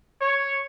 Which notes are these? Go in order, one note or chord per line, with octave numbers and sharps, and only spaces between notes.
C#5